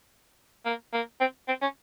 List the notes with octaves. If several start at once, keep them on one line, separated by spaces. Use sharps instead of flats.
A#3
A#3
C4
C4
C#4